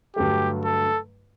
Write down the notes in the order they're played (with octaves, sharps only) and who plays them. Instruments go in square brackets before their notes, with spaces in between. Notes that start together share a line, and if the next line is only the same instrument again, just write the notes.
[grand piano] G2 D3 F#3 A3 [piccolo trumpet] G4
[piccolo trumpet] A4